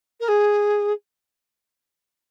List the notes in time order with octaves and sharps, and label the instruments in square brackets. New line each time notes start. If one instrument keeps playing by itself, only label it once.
[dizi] A#4
G#4